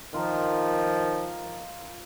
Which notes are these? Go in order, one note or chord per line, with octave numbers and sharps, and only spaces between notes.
D#3 F3 F4 A#4